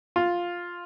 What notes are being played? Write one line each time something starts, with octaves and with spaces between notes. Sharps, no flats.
F4